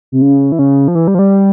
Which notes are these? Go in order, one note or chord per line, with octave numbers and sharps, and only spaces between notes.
C3
C#3
E3
C#3
F3
E3
G3
F3
G3